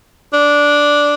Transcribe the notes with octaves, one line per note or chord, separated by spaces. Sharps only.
D4